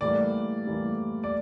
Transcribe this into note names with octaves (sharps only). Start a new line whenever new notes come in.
A2 E3 G3 A#3 D5
A2 E3 G3 A#3
D5